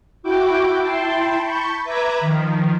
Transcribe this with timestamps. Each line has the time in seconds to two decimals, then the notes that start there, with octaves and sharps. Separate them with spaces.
0.23 E4 F#4 G5 D6
0.80 E4 G5 A5 C6
1.42 A5 B5 C#6 G6
1.84 B4 E5 A#5 B5 D6 G#6
2.20 D#3 F3